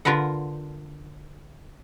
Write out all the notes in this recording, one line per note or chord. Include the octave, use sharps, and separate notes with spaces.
D3 F4 A#4 B4 F#5